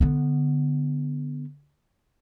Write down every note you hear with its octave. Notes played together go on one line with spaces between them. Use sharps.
D3 B3